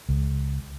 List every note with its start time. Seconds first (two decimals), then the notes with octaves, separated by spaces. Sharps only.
0.09 C#2